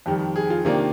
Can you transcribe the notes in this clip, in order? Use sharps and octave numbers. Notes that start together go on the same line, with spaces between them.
F2 D#3 G3 G4
G#4
F4
C3 D#3 A#3 D4